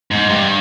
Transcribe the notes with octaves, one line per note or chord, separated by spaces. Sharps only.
G#2
G2